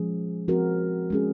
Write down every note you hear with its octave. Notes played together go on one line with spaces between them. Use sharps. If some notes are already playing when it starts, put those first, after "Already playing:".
Already playing: A#2 F3 G#3 C#4 G#4
F3 C4 F#4 A#4
G#3 C#4 G#4